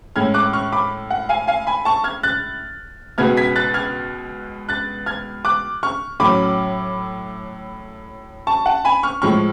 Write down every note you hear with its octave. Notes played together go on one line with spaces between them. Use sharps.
A2 G#3 C#4 F6 G#6
D6 F#6
C#6 F6
B5 D6
F#5
F5 G#5
F5 G#5
G#5 B5
A5 C#6
F6 G#6
F#6 A6
C#2 B2 G#3 B3 F6 G#6
G#6 B6
F#6 A6
F6 G#6
F#6 A6
F6 G#6
D6 F#6
C#6 F6
A2 F#3 C#4 B5 D6
A5 C#6
F#5 A5
G#5 B5
C#6 F6
A2 F3 G#3 C#6 F6